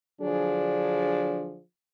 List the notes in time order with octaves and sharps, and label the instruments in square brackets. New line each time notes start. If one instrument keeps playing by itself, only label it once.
[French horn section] D3 F3 F#3 D4 G#4